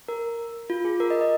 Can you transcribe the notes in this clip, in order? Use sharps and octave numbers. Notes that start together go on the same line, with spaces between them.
A#4
F4
G#4
A#4
D#5
D#5